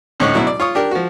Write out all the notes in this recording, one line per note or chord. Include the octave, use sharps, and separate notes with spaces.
D2 A2 D3 C#4 D#4 C#5
B2 F#3 E4 F#4
D5
F4 C#5 D#6
D4 G4 A#4
F3 F#4